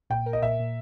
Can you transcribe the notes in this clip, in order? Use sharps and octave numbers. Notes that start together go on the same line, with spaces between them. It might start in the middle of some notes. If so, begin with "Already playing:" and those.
A#2 G5
A#4
D#5
A#2 E5
A#2